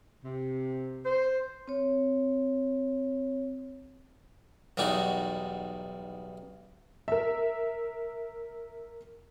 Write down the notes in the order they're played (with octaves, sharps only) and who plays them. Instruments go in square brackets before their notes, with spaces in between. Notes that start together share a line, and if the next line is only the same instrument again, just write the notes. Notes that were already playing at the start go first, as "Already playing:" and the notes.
[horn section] C3
C5
[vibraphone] C4 C#5
[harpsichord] B1 E2 G3 D#4 F#4
[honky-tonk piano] A#4 E5